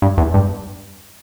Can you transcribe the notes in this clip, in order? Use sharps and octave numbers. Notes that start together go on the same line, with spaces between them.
G2
E2
G2